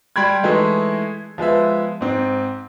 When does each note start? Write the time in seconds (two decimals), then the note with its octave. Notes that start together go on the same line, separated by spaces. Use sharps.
0.16 G3 G5 B5 C6 G#6
0.43 E3 G#3 A3 D#4 E4
1.38 F3 G#3 B3 E5
2.01 G#2 C4